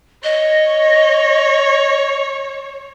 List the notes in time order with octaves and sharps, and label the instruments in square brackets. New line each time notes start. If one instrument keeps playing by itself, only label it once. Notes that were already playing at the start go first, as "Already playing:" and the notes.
[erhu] C#5 [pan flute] D#5